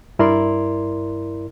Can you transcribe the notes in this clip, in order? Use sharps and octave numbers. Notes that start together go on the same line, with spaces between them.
G2 E4 A#4 D5 C6